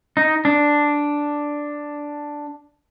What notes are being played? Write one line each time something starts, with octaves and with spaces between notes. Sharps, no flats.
D#4
D4